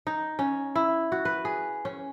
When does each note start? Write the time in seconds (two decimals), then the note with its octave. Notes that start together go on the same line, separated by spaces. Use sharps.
0.07 D#4
0.39 C#4
0.75 E4
1.12 F#4
1.25 B4
1.45 G#4
1.85 C#4